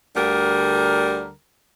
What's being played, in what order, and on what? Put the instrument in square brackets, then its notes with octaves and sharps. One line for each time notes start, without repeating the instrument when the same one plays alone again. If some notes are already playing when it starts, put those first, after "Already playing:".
[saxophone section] D2 D3 G3 A#4